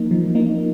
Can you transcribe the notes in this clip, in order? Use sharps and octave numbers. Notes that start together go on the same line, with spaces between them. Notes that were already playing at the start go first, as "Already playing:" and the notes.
Already playing: F3 A#3 D#4
F3
A#3 D#4